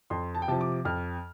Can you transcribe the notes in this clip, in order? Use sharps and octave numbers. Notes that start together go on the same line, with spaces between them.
F2 C6
A5
G5
C3 F3 A5
D6
F2 F6